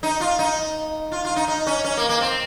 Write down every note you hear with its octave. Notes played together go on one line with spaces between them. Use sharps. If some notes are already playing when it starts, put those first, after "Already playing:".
D#4
F4
D#4
F4
F4
D#4
D#4
C#4
C#4
A#3
A#3
C4